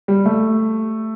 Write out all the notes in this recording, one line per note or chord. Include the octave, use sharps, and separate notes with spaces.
G3
A3